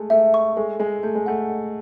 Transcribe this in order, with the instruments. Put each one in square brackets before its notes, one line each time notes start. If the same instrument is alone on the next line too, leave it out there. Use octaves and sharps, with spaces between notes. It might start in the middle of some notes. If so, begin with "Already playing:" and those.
Already playing: [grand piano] G#3 A3
[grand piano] A3 [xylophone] E5
[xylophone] C#6
[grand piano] G#3 [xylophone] A4
[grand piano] G#3 [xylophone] G#5
[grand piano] A3 [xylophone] G6
[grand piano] G#3
[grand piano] A3 [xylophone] F#5
[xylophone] D#5